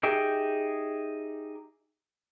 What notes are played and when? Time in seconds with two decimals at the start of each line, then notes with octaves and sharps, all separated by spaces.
0.03 D#4 G4 G#4 E5 G5